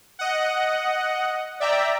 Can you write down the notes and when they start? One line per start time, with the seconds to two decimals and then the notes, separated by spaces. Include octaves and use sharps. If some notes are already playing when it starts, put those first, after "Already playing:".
0.19 D#5 F#5
1.60 D5 E5 G5 A#5